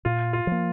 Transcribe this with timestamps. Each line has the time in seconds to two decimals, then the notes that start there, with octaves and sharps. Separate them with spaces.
0.05 A#2 F4
0.33 F4
0.47 F3 A#3